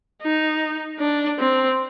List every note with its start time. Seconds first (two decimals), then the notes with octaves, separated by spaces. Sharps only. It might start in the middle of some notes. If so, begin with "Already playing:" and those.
0.22 D#4
0.99 D4
1.39 C4